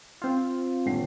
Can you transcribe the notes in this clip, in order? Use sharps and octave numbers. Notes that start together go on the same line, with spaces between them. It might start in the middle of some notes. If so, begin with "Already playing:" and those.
C4 F4
D#1 D3 C7